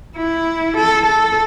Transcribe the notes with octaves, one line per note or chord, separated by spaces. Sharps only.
E4
A4
A4